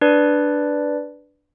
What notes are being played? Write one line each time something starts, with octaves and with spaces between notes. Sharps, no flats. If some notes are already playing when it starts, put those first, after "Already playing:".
D4 B4 D5